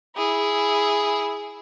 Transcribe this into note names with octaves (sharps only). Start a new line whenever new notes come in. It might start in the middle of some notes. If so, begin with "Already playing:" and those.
E4 G#4